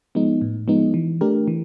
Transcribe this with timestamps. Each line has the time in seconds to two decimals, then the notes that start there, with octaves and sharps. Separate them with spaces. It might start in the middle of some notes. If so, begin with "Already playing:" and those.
0.15 F3 G#3 B3 D#4
0.41 A2
0.68 F3 G#3 B3 D#4
0.94 E3
1.21 A3 D4 G4 A#4
1.48 E3